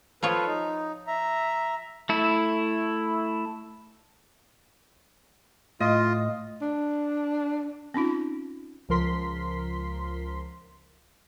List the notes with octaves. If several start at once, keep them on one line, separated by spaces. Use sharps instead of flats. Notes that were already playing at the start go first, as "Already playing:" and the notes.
F3 F4 A4 B4 C#5
D#4
E5 A#5
A3 E4
A2 F4 D#5
D4
C4 C#4 D#4 F4
C#2 F3 A#4 C6 B6